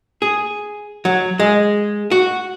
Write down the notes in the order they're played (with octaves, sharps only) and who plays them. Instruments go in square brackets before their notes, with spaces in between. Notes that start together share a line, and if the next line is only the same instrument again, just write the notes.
[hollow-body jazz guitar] G#4
F#3
G#3
F#4